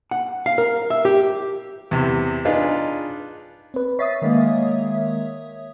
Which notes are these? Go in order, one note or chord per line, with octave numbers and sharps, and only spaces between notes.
F#5
F5
A#4
E5
G4
E2 C3
D4 D#4 F4 G#4 B4
C4 B4
C#5 E5 D#6 A6 B6 C7
D#3 G#3 A#3